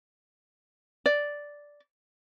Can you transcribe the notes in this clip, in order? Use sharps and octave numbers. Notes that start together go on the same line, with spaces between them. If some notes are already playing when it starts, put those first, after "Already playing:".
D5